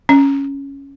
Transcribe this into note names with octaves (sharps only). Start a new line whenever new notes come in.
C#4